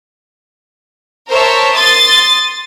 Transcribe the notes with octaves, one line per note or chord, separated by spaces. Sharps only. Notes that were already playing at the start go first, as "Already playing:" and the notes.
A#4 C5 C#5 E5 A5
C6 D#6 A6